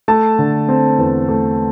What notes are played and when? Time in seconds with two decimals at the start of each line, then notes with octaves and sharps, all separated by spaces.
0.08 A3 A5
0.39 D3
0.68 C4
0.98 E2
1.29 A3